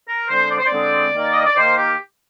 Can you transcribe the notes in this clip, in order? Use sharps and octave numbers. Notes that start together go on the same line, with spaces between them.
A#4
D3 G#3 C4 C5
D5
C5
D5
D3 G#3 C4
D#3 A#3
D#5
D5
D#3 A#3 C5
G4